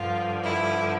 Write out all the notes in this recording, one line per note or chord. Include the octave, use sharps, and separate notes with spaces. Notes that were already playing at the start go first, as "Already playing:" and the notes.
Already playing: G2 D3 F3 F4
E4